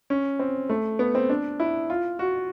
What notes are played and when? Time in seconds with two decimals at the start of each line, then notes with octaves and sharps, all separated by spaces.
0.10 C#4
0.39 C4
0.70 A3
0.99 B3
1.15 C4
1.29 D4
1.60 E4
1.90 F4
2.19 F#4